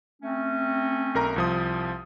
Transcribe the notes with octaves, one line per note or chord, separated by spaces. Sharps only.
A3 C4 C#4
B1 A#4 A#5
C2 F3 D#6